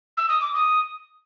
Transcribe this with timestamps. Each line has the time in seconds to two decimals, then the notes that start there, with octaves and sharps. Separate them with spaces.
0.17 E6
0.29 D#6
0.41 D6
0.54 D#6